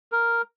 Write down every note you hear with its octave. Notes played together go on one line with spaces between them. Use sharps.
A#4